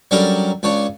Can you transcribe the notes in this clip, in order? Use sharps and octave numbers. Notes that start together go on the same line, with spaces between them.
F#3 G3 C#4 D4 A4 A#4
C#2 D4 C#5